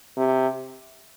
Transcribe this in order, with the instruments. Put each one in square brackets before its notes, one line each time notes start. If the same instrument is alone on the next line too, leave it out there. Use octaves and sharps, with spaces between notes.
[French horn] C3